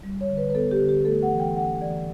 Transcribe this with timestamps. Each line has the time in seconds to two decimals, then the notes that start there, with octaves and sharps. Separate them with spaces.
0.04 G3
0.21 C#5
0.30 D3
0.37 B4
0.50 B4
0.54 B3 A4
0.71 G4
0.80 D3
0.89 G4
1.05 A3 A4
1.23 F#5
1.31 E3
1.40 G5
1.56 C#4 F#5
1.81 E3 D5